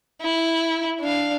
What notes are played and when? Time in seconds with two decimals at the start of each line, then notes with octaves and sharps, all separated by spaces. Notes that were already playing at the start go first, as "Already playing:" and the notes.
0.22 E4
1.00 D4 F5